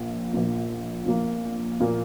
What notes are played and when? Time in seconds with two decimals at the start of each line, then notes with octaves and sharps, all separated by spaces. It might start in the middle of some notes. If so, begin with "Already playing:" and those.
Already playing: A#1 A#2 A#3
0.33 A#1 A#2 A#3
1.06 A#1 A#2 A#3
1.80 A#2 A#3